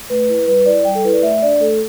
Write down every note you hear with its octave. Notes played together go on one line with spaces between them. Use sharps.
A3 B4
E4
G3 B4
E4 D5
G3 G5
A4
E4 B4
D5
A3 E5
D4 D5
A3 A4